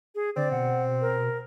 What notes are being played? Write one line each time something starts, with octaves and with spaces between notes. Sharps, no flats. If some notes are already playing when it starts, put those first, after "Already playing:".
G#4
D3 C4 D5
B2 F#5
A#4